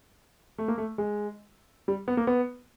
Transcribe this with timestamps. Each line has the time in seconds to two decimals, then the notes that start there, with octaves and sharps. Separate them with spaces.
0.58 A3
0.68 A#3
0.78 A3
0.98 G#3
1.88 G3
2.08 B3
2.17 A#3
2.27 B3